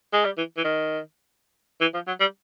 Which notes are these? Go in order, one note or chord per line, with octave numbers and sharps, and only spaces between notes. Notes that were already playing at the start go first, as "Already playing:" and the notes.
G#3
G3
E3
E3
D#3
E3
F3
F#3
G3